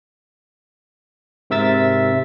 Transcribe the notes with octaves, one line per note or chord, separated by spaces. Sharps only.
G#2 C3 A#4 E5 E6 A6